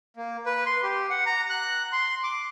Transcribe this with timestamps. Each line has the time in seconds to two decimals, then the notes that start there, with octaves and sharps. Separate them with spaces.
0.17 A#3
0.46 B4
0.66 C6
0.83 G4
1.10 F#5
1.26 A#5
1.50 F#6
1.93 C6
2.24 D6